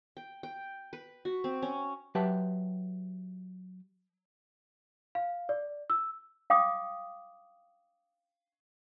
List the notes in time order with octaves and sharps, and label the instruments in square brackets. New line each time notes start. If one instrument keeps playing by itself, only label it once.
[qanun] G5
G5
B4
F#4
C4
C#4
[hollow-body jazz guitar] F#3 G4 B4 E5 A5
[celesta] F5
D5
E6
[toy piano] F5 G5 D6 D#6